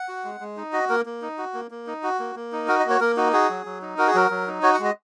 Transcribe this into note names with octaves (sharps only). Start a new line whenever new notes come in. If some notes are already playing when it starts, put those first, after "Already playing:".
Already playing: F#5
F#4
G#3
G#3
D#4
F#4 D#5
A#3 A#4
A#3
D#4
F#4
A#3
A#3
D#4
F#4
A#3
A#3
D#4
F#4 A#4
D#5
A#3
C#5
A#3 A#4
D#4 F#4
F#4 G#4
F#3
F#3
D#4
F#4 A#4
G#4
F#3 A#4
F#3
D#4
F#4 C#5
F#5
G#3
D#5